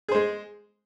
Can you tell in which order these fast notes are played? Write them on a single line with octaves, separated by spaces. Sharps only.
G#4 C5 G#3